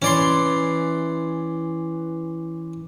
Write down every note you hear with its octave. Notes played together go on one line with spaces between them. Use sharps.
E3 C#4 D5 C6